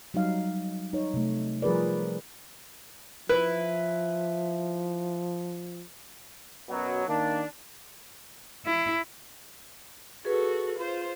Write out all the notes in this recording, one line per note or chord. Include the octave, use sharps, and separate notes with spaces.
F#3 G3 D#4 F5
D#4 C#5
C3 A3
F3 G3 G#4 A#4 B4 D5
F3 E4 B4
F#2 B2 F#3
D#3 A#3 D4
E4
F#4 G#4 A4 B4
F4 C5